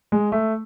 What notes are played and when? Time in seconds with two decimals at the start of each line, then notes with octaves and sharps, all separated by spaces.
0.12 G#3
0.32 A3